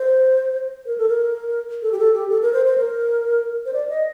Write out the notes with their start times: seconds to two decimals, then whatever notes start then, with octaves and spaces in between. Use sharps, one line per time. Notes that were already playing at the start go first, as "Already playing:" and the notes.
Already playing: C5
0.86 A#4
0.98 A4
1.08 A#4
1.82 A4
1.92 G4
1.99 A4
2.14 G4
2.30 A4
2.42 A#4
2.53 C5
2.66 C5
2.78 A#4
3.66 C5
3.73 D5
3.89 D#5